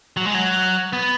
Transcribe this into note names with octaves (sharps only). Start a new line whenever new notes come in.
F#3
G#3
F#3
B3